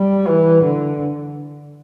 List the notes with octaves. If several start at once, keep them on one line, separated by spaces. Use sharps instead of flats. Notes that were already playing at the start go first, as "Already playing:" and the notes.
Already playing: G3
E3
D3